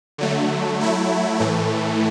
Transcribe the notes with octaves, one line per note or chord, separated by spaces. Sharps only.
D3 F#3 A3
F#3 A3 E4
A2 E3 A3